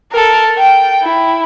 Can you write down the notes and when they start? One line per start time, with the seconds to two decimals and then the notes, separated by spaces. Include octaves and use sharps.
0.12 A4 A#4
0.58 G5
1.02 E4